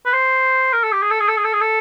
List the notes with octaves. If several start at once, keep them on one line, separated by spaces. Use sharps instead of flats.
B4
C5
A#4
A4
G4
G#4
A4
G#4
A4
G#4
A4
G#4
A4